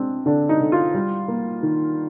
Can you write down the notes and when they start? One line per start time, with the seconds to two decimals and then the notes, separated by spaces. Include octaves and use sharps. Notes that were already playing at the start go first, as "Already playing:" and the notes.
Already playing: G#3 C4 D4
0.26 D3 D4
0.49 D#4
0.61 D3
0.72 F4
0.94 G3
1.28 A#3
1.63 D#3